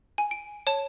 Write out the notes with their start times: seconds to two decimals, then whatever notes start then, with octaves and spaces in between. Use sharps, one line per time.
0.18 G#5
0.31 D7
0.67 C#5 A5